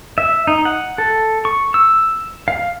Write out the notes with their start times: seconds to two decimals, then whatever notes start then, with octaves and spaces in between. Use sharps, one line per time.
0.18 E5
0.47 D#4
0.65 F#5
0.98 A4
1.45 C#6
1.74 E6
2.48 F5